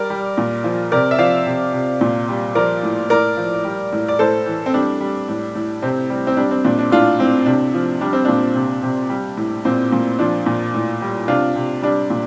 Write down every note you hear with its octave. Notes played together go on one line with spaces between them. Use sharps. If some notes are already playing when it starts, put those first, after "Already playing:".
Already playing: G3 A#4 D5
G3
A#2
F3
C3 A#4 D5
E5
F3 D5 F5
C3
C3
A#2
G3
F3 A#4 D5
A2
A2 A#4 D5
F3
G3
A2
D5
A2 A4 C5
E3
C4
G3 D4
G3
A2
A2
C3 C4
G3
C4
G3 D4
C4
A#2 D4
D4
A2 D4 F4
A2 C4
C3 D4
F3
G3 D4
C4
A#2 D4
C3
C3
G3
A2
A#2 C4
A#2
F3 D4
A#2
A2
G3
C3 D4 F4
C3
G3 D4
A#2